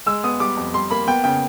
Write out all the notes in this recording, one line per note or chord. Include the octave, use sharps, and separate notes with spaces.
G#3 E6
B3 D#6
G3 D6
F2
G3 C6
A#3 B5
B3 G5
C#3 G5